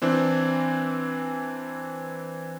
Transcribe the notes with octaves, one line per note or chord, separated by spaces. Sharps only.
E3 C4 D4